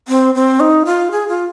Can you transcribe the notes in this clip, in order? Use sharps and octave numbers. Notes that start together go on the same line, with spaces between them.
C4
C4
D#4
F4
G#4
F4